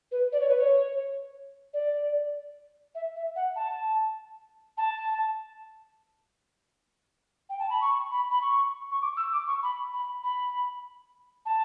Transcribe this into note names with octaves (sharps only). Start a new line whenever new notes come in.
B4
D5
C#5
B4
C#5
D5
E5
E5
F#5
A5
A5
G5
A5
B5
C#6
B5
B5
C#6
C#6
D6
E6
D6
C#6
B5
B5
B5
A5